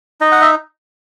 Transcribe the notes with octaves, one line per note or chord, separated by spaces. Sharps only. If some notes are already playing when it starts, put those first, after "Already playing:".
D#4 D#5
F#5
E5